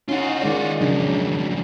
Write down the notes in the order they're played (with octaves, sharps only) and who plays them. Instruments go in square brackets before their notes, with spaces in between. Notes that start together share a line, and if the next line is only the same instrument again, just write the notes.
[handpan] C#4 D#4 [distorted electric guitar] F4 F#4
[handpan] D#3 G#3 D5
[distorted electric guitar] F2 G#2 [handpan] C#3 F#3 D4